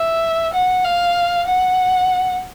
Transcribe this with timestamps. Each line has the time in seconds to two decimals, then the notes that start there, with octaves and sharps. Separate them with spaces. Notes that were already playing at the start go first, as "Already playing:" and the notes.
Already playing: E5
0.53 F#5
0.85 F5
1.47 F#5